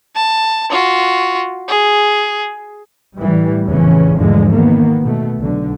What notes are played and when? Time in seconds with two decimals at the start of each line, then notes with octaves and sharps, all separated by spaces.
0.15 A5
0.70 F4 F#4
1.68 G#4
3.18 A2 E3 G3
3.67 F1 E2 A2 C#3 E3 C#4
4.16 E2 G#2 D3 F3 G#3 A3
4.50 D#3 A#3 B3
5.01 B2 A3
5.37 B1 D3